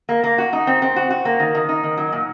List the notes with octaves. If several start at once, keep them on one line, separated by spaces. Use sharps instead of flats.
A#3
A#3
F#4
D#4
C4
C4
F#4
F#4
A#3
D#3
D#3
D#4
D#3
F#3
A#2